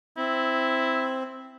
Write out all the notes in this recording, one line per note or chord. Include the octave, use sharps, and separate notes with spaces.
C4 E4